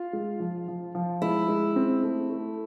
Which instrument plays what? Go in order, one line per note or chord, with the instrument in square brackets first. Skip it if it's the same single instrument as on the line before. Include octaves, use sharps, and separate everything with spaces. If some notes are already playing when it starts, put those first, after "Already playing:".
Already playing: [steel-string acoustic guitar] F4
[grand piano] G#3
F3
F3
F3
[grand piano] G#3 [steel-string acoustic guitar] E4
[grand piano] G#3
C4
A3
A3